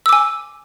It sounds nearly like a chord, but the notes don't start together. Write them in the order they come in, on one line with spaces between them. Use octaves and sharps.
E6 D6 G#5